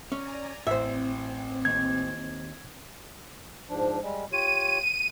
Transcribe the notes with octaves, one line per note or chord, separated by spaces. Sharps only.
C#4 D5 G#5 A#5
A1 C4 C5 E5
D#2 G#6
G#2 F3 D4
G3 G#3
F4 G4 C#5 D#7